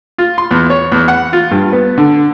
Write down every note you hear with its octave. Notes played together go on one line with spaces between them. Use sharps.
F4
C6
E2
C#5
E2
F#5
F4
G2
B3
D3